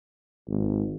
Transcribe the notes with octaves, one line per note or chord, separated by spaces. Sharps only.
G#1